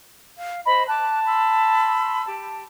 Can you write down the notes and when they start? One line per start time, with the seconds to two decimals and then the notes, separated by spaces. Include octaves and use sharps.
0.37 F5
0.66 C5 D#5 B5
0.88 A5 D6 F#6
1.27 B5 C6 E6
2.28 G4 A5